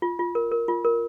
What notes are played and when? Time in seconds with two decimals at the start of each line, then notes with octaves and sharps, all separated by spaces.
0.02 F4
0.19 F4
0.35 A#4
0.52 A#4
0.68 F4
0.85 A#4